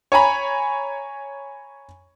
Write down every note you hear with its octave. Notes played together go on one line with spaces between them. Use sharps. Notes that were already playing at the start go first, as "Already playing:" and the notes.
C#5 G#5 A#5 B5